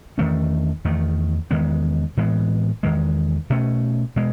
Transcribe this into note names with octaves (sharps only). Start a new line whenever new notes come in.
E2 D#3 A3 C#4
E2 D#3 A3
E2 D#3 G#3 B3
A2 E3 G#3 B3
E2 D#3 G#3
B2 A3 C#4
B2 G#3